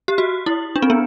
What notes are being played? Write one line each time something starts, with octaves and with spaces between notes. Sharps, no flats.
G4
F#4
E4
D4
C4
B3